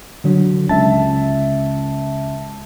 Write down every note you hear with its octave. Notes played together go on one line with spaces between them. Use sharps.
D3 F#3 D4
C#2 E5 A5 A6